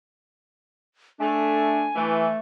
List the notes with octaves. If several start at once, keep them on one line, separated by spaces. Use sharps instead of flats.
A3 D4 G#5
E3 A3